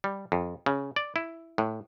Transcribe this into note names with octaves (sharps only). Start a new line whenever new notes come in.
G3
F2
C#3
D5
E4
A2